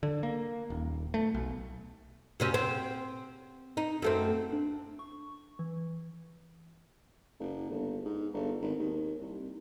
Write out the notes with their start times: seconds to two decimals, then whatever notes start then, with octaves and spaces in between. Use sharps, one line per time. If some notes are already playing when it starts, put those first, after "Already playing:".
0.03 D3
0.23 A#3
0.70 D#1
1.14 A3
1.34 B1
2.40 F#2 C3 C#4
2.54 C4
3.77 D#4
4.02 F#2 A3 C4
4.52 D4
4.99 C#6
5.59 E3
7.40 F#1
7.70 G1
8.05 G#2
8.34 G1
8.61 G#1
8.79 D#2
9.21 C2